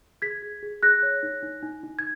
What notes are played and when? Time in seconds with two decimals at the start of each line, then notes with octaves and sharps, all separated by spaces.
0.22 G#4 G#6 B6
0.42 G#4
0.63 G#4
0.83 G#4 F#6 A#6
1.03 C#5
1.23 D#4
1.43 D#4
1.63 D#4
1.83 D#4
1.99 G#6